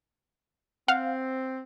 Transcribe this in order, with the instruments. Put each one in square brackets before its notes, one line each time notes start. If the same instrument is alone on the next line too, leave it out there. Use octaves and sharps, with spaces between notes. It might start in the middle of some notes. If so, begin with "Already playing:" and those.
[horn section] C4 [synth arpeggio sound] F5 F#5